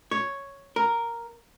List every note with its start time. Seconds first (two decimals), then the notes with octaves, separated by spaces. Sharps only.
0.11 C#5
0.76 A#4